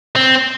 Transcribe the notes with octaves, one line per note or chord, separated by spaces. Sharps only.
C4